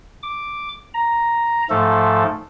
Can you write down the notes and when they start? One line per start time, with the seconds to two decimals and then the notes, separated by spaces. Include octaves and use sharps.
0.23 D6
0.94 A#5
1.70 G#2 F3 A3 A4